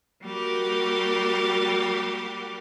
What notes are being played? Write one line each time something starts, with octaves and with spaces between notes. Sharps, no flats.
G3 A#3 F#4 G4 A#4